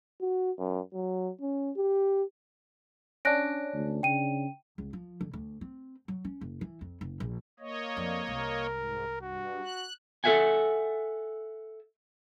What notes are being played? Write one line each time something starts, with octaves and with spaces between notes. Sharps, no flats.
F#4
F#2
F#3
C#4
G4
C#4 D4 F#6 A#6 D7
D2
C#3 G5 D#7
C#2
F3
D3
D2
C4
F#3
C#4
F#1
E3
F2
F#1
A#1
A#3 C#5 D#5
F2 D5
C2 A#4
G#2
G2 F#4
F#6
A4 B4 E5 F#5 G#5